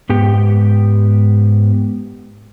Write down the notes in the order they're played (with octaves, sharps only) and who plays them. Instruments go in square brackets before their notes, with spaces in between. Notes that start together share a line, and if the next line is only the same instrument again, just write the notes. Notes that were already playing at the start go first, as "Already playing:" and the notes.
[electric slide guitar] G#2 B3 G4